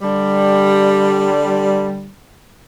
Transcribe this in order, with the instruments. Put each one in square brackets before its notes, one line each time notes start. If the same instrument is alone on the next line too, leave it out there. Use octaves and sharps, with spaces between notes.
[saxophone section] D3 G3